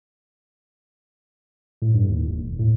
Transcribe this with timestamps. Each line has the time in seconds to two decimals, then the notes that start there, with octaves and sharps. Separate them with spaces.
1.82 A2
1.94 G2
2.09 D#2
2.27 E1
2.59 A2